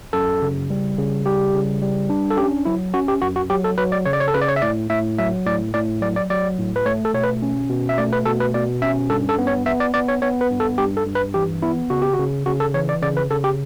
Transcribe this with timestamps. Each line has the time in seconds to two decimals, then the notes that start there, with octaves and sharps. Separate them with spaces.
0.13 F#2 A4
0.42 C#3
0.70 G3
0.98 C#3
1.26 G3 G4
1.54 C#3
1.82 G3
2.10 D4
2.31 A4
2.37 C#4 G4
2.65 F#3 E4
2.93 C#4 F#4
3.08 G4
3.22 F#2 F#4
3.36 F#4
3.50 F#3 G4
3.64 A4
3.78 F#3 B4
3.92 D5
4.06 C#3 C#5
4.13 D5
4.20 C#5
4.28 A4
4.34 C#3 B4
4.41 D5
4.48 C#5
4.56 E5
4.62 A2 D5
4.90 A2 E5
5.18 F#3 E5
5.46 A2 D5
5.74 A2 D5
6.01 F#3 D5
6.16 D5
6.30 F#3 D5
6.58 A2
6.76 B4
6.85 A3 C#5
7.05 A4
7.14 B2 C#5
7.23 B4
7.42 C#4
7.70 B2
7.89 E5
7.98 A3 D5
8.13 B4
8.26 B2 A4
8.40 B4
8.54 B2 D5
8.82 C#4 E5
9.10 G2 A4
9.29 A4
9.38 B3
9.47 C#5
9.66 B3 E5
9.80 D5
9.94 B3 D5
10.08 C#5
10.22 B3 C#5
10.41 B4
10.50 G2
10.60 A4
10.78 G2 G4
10.97 A4
11.06 G2
11.15 B4
11.34 E3 G4
11.62 B3 E4
11.90 C#3 F#4
12.02 G4
12.14 F#4
12.19 C#3
12.46 C#3 F#4
12.60 A4
12.74 E3 C#5
12.89 D5
13.02 C#3 D5
13.17 B4
13.30 C#3 A4
13.44 G4